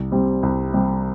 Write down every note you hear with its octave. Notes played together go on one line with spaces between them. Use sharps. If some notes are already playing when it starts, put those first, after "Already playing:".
Already playing: C2
C3 G3 C4
C2
C3 G3 C4